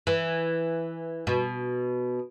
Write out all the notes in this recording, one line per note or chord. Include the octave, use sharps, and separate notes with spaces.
E3
B2